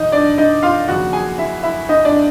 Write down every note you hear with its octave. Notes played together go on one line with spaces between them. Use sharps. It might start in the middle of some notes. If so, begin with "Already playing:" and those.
Already playing: E1 E2 D#4 D#5
D4 D5
D#4 D#5
F4 F5
D#2 C#3 F3 F#4 F#5
G#4 G#5
E4 E5
E4 E5
D#4 D#5
D4 D5